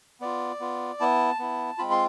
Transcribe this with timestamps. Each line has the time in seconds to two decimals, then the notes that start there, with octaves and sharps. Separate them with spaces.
0.21 B3 F4 D5
0.60 B3 F4
1.00 B3 E4 A5
1.39 B3 E4
1.78 G#3 C4 F4 B5
1.91 C6